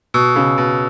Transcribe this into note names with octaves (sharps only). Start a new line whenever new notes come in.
B2 E6
C#3
E6
B2